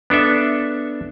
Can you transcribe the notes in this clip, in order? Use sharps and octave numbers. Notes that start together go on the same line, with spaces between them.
B3 D4 A4 E5